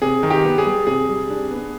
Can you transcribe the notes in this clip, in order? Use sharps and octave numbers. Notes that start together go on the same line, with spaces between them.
C3 G#4
D#3
G4
B3
G#4
G3
C3 G#4
G3
D4
B3